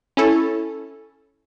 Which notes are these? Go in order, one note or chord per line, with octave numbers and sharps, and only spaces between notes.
C#4 E4 A4